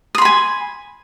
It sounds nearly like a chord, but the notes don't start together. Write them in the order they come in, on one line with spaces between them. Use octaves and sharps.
D#6 C6 B5 G#5